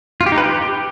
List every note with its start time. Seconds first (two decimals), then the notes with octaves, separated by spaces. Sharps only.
0.21 F4
0.26 G4
0.32 D#4
0.38 B4
0.43 G4